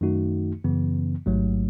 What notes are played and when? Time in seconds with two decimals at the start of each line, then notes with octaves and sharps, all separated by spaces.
0.01 F#2 D#3 A3 D#4 F#4
0.64 F#2 C#3 E3 B3
1.26 A1 G#2 F#3 A3